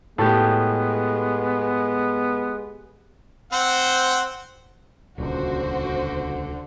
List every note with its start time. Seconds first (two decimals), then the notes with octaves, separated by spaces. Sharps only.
0.18 A2 G#3 B3 G4 A4
3.53 C4 C5 F#5
5.18 D#1 C#2 D3 F#4 C5